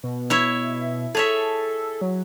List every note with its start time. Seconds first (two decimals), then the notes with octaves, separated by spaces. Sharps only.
0.03 B2
0.30 E4 C#5 E5
1.15 G#4 A4 C#5 E5
2.01 F#3